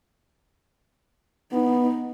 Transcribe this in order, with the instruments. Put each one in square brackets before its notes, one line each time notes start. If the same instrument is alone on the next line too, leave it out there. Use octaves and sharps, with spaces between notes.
[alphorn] B3 [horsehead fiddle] D#4